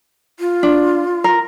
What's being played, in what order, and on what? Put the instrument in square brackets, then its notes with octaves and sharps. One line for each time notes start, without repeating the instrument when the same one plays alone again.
[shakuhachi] F4
[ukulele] D4
A#4